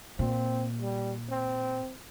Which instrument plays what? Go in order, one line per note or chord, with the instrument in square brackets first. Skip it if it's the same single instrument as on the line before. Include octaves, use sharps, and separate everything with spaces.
[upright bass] A#2 [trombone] C4
[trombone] G3
C4